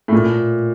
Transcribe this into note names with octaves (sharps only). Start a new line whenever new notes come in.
A2
A#2